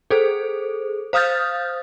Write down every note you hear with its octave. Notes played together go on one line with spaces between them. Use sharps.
G#4 A4 C5
C5 F5 D#6 F6 G6 A6